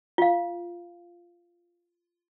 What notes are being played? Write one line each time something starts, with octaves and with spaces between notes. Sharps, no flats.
F4 F5